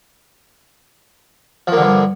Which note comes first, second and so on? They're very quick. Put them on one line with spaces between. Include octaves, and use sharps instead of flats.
F3 A#3 D3 G2